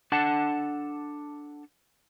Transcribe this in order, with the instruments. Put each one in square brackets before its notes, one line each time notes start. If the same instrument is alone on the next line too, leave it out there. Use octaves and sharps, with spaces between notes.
[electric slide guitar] D4 A4 F#5 A5